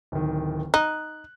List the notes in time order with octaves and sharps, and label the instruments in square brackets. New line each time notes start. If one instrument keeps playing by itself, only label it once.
[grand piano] D1 D#3
[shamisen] D#4 [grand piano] F#6